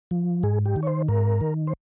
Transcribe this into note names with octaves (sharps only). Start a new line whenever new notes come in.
F3
G#2 G#4
G4
D#3
C#5
C5
G#2 A#4
D#3
C5